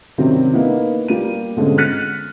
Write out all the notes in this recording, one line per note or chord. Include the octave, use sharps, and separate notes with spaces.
C3 D#3 F#3 G3 C4 C#4
A#3 B3 D#4 E4
G3 A#3 D#7
B2 D3 G#3 C4 C#4
F6 F#6 A6 B6 C#7 D#7